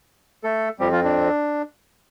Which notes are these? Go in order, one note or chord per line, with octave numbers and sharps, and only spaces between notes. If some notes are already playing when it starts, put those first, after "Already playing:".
A3 A4
F2 F3 G3 C4 G4
F3 F4
D4